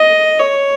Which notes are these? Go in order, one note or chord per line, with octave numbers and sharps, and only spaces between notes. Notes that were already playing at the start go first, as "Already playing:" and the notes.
Already playing: D#5
C#5